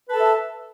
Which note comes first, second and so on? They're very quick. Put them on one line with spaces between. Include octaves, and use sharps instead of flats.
B4 A5 A4 E5